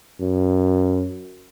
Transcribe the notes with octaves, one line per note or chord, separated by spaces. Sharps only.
F#2